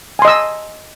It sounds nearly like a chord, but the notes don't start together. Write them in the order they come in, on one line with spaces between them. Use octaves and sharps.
G#5 C6 D#5 E6